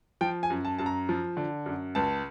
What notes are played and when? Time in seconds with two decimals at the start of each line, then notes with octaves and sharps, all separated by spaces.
0.21 F3 G5
0.43 G#5
0.50 F#2
0.65 A5
0.78 F#2 A5
0.86 A#5
1.09 F3
1.37 D3
1.66 F#2
1.95 C#2 A5